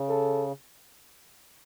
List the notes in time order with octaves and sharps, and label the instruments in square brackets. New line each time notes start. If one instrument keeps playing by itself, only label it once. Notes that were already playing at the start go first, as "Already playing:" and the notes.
Already playing: [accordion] C#3
[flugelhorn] A4